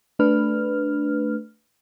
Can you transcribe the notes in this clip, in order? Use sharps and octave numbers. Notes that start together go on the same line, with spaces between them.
A3 D4 B4 F6